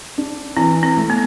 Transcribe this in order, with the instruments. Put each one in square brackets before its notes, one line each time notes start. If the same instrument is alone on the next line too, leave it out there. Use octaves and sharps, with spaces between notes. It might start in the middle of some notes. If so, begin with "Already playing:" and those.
[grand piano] D4
[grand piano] E3 [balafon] C4
[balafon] C4
[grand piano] A3
[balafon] B3